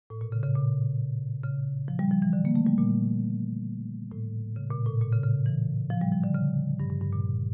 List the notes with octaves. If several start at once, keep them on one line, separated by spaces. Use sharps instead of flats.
A2
A#2
C#3
C#3
A#2
C#3
F3
G3
F3
E3
D3
A#3
A3
G3
A#2
A2
C#3
A#2
A2
A#2
C#3
C#3
E3
F3
G3
F3
D3
C#3
G2
G2
G2
A#2